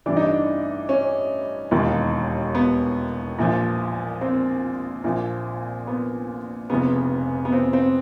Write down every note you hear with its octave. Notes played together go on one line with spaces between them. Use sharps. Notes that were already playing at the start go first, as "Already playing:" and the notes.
A1 G2 E3 D4
D#4
D4
C#4
E1 D#2 D#3
B3
A#1 A#2 F3
C4
A#1 A#2 F3
B3
F1 F2 C#3 B3
B3
C4
C4